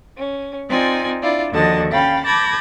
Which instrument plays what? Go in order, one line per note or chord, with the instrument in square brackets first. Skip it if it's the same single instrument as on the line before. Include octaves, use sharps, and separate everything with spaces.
[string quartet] C#4
C4 D#4 F4 D5 G#5
D4 E4 F4 D5
D#2 D3 F3 F#4 D#5 A5
C#4 F5 G5 B5 A6
A5 B5 D6 G6 G#6 A#6